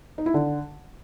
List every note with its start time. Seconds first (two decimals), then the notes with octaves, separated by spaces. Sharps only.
0.18 D#4
0.26 E4
0.34 D3